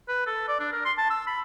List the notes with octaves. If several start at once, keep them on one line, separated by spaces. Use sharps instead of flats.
B4
A4
D5
D4
A#4
C6
A5
E6
B5